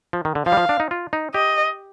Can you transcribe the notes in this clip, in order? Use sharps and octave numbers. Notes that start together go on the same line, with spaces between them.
F3
D#3
D3
F3 F5
G3
F3
D4
D#4
F4
D#4
G4 D#5